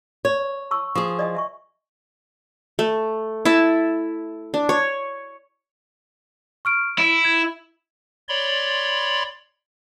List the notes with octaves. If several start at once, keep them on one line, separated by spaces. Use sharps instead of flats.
C#5
A5 C#6 E6
F3 G#4 C#6
D5 D#5 G#5
E5 G#5 C#6
A3
E4 E5 A5
D4
C#5
C#6 F6 D7
E4 D7
G#6
C#5 D5 B5 C6